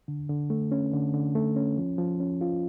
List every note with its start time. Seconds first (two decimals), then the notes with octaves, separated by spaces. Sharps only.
0.08 D3
0.29 D3
0.50 A3
0.72 C#4
0.93 D3
1.14 D3
1.35 A3
1.56 C#4
1.78 F3
1.98 F3
2.20 C#4
2.41 F4